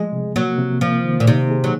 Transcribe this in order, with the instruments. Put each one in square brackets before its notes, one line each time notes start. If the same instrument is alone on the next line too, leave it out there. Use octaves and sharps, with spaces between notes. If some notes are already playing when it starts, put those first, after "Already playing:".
Already playing: [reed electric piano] F3 [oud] G#3
[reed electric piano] C3
[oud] F#3 [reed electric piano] A#3
[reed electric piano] C3
[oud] F3 [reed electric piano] A#3
[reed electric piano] D#3
[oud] A#2
[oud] C3 [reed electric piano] D#4
[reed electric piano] G#4
[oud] F#3